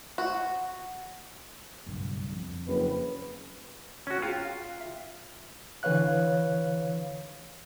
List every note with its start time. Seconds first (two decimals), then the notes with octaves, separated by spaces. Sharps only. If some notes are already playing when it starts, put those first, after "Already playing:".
0.18 F#4
1.87 F#1 B1 G2
2.33 F2
2.67 F#1 C4 B4
4.07 C#4 F#4
4.22 F4 G#4 G5 A#5
4.45 F5
4.80 E5
5.83 D3 E3 B4 C#5 F5 F#6